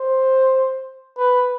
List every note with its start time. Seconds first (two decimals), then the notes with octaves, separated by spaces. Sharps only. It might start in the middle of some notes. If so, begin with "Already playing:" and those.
Already playing: C5
1.17 B4